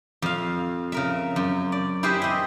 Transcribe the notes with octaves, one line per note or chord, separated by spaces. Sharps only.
F2 F5
C#3 A#4 E5
F#2
D5
E4 G4 G#4 B4 C5 E5
C4 D#5